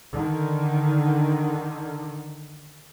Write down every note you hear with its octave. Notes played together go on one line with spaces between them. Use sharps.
D3 D#3